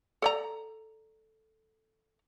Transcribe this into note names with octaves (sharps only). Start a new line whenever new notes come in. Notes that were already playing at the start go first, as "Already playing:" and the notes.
A4 D5 A#5